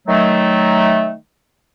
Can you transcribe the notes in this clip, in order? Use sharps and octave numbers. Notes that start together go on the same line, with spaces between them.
D#3 F#3 A3